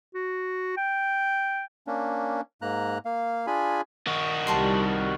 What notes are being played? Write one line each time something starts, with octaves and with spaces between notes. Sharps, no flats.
F#4
G5
A#3 C#4 D4
G#2 A#3 A#5 F#6
A#3 F5
D4 F4 G#4 G#5 B5
D#3 F#4
C2 G3 A5 A#5 C6